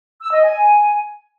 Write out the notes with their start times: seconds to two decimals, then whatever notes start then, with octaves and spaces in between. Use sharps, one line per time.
0.22 E6
0.32 D#5
0.43 G#5